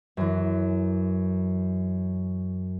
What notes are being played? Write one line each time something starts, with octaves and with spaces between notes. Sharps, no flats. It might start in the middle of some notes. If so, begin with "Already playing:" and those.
F#2 E3